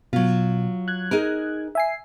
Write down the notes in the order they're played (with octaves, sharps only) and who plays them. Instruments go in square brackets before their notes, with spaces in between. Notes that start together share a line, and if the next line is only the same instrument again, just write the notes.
[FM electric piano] B2 [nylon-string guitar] F#3 F4
[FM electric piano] F#6 G#6
[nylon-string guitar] D#4 G#4 A#4
[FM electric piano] E5 G#5 C7